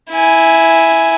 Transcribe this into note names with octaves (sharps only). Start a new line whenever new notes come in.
E4 G#5